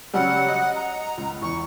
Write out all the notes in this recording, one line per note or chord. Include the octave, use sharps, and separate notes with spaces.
C#3 F#3 G3 F#5
D#5
A#5
C#2
E2 C#6